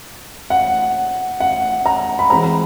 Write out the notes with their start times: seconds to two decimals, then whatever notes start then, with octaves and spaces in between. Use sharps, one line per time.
0.50 F#5
1.40 F#5
1.86 A#5
2.19 B5
2.30 E3 G#3 C4 A#5